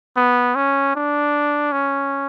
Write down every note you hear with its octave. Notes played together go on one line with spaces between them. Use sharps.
B3
C#4
D4
C#4